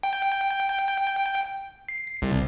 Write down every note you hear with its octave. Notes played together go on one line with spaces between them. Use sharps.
G5
C7
C2